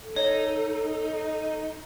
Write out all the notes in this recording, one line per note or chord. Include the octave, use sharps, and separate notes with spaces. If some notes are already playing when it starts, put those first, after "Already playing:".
A4
D#4 C#5